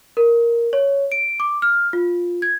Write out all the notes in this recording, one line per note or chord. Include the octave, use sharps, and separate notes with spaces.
A#4
C#5
D7
D6
F6
F4
G#6